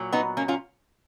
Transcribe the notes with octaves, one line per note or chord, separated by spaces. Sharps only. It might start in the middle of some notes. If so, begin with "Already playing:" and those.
Already playing: A#2 F#3
B3 D#4
A#3 C#4
C#4 F4